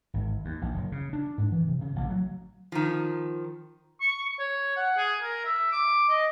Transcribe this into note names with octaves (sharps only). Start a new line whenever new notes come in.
G#1
D#2
A#1
F#1
C#3
D4
G#2
E3
C3
C#3
A1
F#3
D#3 F3
C#6
C#5
F#5
G#4
A#4
E5
D6
D#5